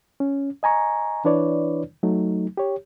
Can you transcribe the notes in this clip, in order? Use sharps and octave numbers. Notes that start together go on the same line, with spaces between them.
C#4
D#5 G#5 A#5 C#6
E3 D4 E4 B4 C#5 D5
F#3 A3 D#4
G4 C#5